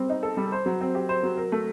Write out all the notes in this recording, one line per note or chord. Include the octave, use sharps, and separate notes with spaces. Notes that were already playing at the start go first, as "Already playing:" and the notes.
Already playing: G3 C4
D#4
A4
G3
C5
F#3
C4
G4
C5
F#3
A#4
A3